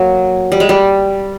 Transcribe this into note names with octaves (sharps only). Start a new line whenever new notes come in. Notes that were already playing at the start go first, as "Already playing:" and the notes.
Already playing: F#3 A#3
G3
G#3
G3